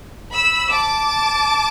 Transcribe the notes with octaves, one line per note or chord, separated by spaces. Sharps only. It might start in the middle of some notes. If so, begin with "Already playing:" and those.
B5 E6
A5 D6